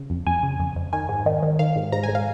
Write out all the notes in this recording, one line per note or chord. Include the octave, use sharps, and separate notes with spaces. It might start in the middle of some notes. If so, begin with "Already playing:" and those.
Already playing: C#3
F2
F2 G#5
C#3
F2
F2
D#3 G#5
G#2
D#3
D#3
D#3 F5
G#2
G#2 A#5
G#2 G#5
F5